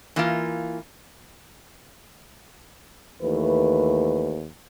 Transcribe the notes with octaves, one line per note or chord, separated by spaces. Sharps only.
E3 A#3 F4
D#2 E3 A3 B4